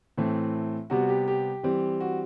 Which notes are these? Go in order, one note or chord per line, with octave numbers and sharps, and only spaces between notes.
A2 E3 A3 C4
C3 G3 B3 F#4
G4
G4
E3 G3 C4
F#4